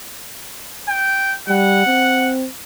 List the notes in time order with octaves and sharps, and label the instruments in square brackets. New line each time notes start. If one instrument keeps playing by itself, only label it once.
[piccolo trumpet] G5
[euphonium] G3 [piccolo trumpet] F#5
[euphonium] C4